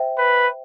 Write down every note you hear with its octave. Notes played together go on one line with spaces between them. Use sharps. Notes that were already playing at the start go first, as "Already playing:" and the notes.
Already playing: C5 E5 G5
B4